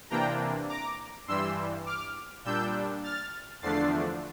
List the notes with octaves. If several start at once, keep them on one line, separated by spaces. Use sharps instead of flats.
C3 E3 A#3 D4 G5 A#5
A#5 D6
G2 E3 G3 C6 E6
D6 F6
A#2 G3 D4 E6 G6
F6 A6
E2 D3 F3 A3 D4 A6 C7